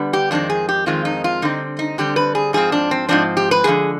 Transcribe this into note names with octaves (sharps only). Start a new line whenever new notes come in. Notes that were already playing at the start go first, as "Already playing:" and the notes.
Already playing: D3 G3 B3
G4
F2 D#3 G#3 C4 D4
G#4
G4
F2 D#3 G#3 C4 F4
D#4
F4
D3 G3 C4 D#4
D#4
D3 G3 C4 G4
B4
G#4
G#2 F3 C4 G#4
D4
C4
G#2 F3 C4 D4
G4
B4
D3 F3 G#3 B3 G#4